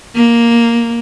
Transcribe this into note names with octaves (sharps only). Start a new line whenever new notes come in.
A#3